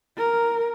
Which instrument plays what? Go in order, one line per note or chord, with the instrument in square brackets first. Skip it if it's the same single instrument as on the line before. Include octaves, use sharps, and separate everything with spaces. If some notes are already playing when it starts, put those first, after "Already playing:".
[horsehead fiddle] A#4